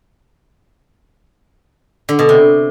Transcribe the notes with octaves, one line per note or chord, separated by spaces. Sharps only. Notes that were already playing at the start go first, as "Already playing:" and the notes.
D3
B2
C3